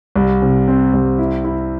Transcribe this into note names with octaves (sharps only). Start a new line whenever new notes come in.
C2
C3
C4
C2
E4
E4